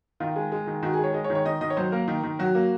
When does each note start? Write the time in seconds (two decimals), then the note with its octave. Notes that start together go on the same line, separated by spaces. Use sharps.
0.20 D#3 F4
0.36 G#3
0.52 G#3
0.67 D#3
0.83 D#3 F#4
0.93 G#4
0.99 G#3 C#5
1.14 G#3 D#5
1.24 C#5
1.30 D#3
1.35 C#5
1.45 D#3 D#5
1.61 D#3 D#5
1.70 C#5
1.77 F#3 C5
1.92 A#3 A#4
2.08 D#3
2.23 D#3
2.39 F#3 F#4
2.55 A#3